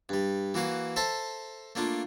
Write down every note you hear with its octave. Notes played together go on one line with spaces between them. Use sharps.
G2 G3
E3 A#3 F#4 F5
A4 C5 E5 A5 A#5
A3 A#3 D4 F4